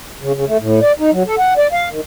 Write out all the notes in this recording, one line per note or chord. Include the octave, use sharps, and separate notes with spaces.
C#3
C#3
A3
A2
D5
D#4
F#3
A4
F#5
D5
F5
D#3